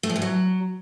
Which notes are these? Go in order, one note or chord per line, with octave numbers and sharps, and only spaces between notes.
A3
F3
A2
F#3